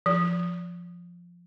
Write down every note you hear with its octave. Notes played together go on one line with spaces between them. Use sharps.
F3